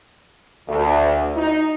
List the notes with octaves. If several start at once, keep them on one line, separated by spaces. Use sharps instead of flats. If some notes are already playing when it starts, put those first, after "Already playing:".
D2
D#4